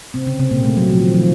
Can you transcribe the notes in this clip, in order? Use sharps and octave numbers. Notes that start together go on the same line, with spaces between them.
C3 C4
C#3 C#4
C3 C4
A#2 A#3
A3
F#3
F3
D#3
F3